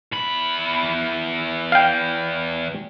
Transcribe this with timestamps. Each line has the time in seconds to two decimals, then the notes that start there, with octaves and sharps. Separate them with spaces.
0.12 E2 B5
1.72 F5 G5